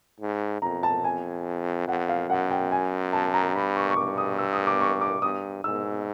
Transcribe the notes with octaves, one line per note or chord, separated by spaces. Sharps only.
G#2
F2 A#5
A5
G#5
F2 F#5
F5
F#2 F#5
G5
G#5
A5
A#5
G2 B5
C#6
C#6
G2 D6
D#6
E6
D#6
D6
C#6
D6
G2 D#6
G#2 E6